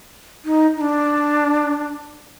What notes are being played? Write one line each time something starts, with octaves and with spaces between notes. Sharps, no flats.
D#4
D#4
D4